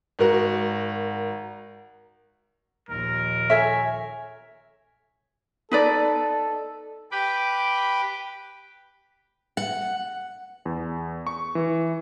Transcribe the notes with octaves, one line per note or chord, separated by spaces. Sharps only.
G#1 F#4 A#4 F#5
A#1 D#2 A#4
A4 C#5 E5 G#5
D#4 A4 B4 D5
G4 B4 G5 B5 D6
F#5
E2
C#6
E3